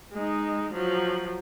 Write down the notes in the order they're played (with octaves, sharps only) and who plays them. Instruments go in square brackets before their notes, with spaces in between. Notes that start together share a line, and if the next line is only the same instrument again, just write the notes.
[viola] G#3 D#4
F3 F#3